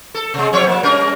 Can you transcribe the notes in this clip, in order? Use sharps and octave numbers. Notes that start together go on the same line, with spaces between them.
A4
C3 G#3
F3 C4 C#5
A#3
G3 C#4 A#4